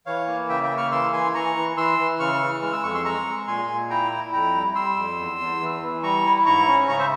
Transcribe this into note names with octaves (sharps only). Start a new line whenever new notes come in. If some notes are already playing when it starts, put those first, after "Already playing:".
E3 C#5 F5
A#3
C#3 E5 G5
E5 G5
A#3
C#6 F6
E3 C6 E6
E3 G#5 C6
E3 A#5 C#6
E3
E3 C6 E6
E3
C#3 C#6 F6
E3
G#3 F6
E6
F2 C#6
C6 E6
G#3 A#5 C#6
G#3
A#2 G#5 C6
A#2
E4 G5 A#5
E4
F2 G5 A#5
G3
G3 C6 E6
F2
E2
E2
E3
E3
G3 A#5 C#6
E4
G#2 A#5 C#6
C#4
C#3 A#5 C#6
C5 E5